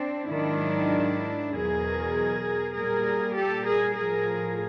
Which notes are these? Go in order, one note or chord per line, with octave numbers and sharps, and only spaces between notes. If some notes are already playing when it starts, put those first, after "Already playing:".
Already playing: C4 D4
G#2 D#3 F#3 D4 E4
E2 B2 F#3 G#4 A#4
A#2 G3 G#4 A#4
G4 A4
G#4 A#4
A2 F3 G#4 A#4